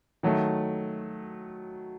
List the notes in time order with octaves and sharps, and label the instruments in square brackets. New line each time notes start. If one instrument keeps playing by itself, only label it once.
[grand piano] D#3 F#3 A3